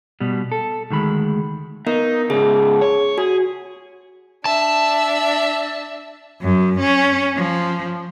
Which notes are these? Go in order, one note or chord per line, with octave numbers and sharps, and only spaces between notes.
B2 G3
A4
D2 D#3 G#3 B5
B3 D#4 A#4
G#2 C#3 G#4
C#5
F#4 G#4
D4 E5 A5
F#2
C#4
F3